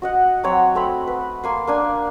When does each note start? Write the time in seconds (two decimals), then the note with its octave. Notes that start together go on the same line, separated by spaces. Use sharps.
0.02 F#4 D#5 F#5
0.44 F#3 C4 C#5
0.75 A3 C4 B5
1.07 B4
1.44 A#3 G#5 C6
1.67 A#3 D4 G#5